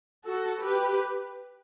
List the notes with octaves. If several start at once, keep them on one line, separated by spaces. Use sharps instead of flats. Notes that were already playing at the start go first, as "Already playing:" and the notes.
F#4 A4
G4 B4